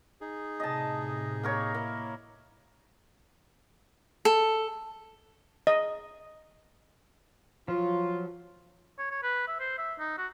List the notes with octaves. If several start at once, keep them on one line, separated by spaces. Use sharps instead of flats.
D#4 G#4
A2 C3 D#5 A5
A#3 A#4 C#5
A#3 E4
A4
D#5
F3 F#3 F4
C#5
C#5
B4
E5
C5
E5
D#4
F#4